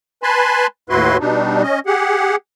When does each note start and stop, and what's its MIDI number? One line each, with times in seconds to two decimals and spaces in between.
0.23 0.67 71
0.23 0.67 80
0.23 0.67 81
0.23 0.67 83
0.23 0.67 84
0.90 1.17 39
0.90 1.17 45
0.90 1.17 64
0.90 1.17 66
0.90 1.17 71
0.90 1.17 84
1.20 1.63 47
1.20 1.63 55
1.20 1.63 62
1.20 1.63 63
1.63 1.79 61
1.63 1.79 75
1.87 2.36 67
1.87 2.36 68
1.87 2.36 78